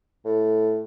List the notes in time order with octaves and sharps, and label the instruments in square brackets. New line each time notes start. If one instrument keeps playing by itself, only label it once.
[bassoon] A2